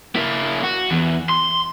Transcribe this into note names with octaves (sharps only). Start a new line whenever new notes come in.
A#3 E4
F#4
E2
C6